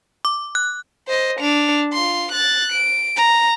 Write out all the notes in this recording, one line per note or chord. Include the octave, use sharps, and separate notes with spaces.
D6
F#6
C5 D#5
D4 F7
F4 C6
F#6 A6
D7
A#5